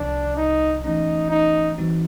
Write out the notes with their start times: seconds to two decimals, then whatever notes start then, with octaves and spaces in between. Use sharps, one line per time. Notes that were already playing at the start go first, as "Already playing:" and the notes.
Already playing: C2 C3 F3 D4
0.37 D#4
0.84 E3 A3 C#4 D#4
1.30 D#4
1.78 E3 G3 C4 D#4 F#4